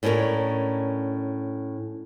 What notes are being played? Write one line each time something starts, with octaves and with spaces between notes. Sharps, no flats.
A2 C#4 D4 G#4 A#4 C#5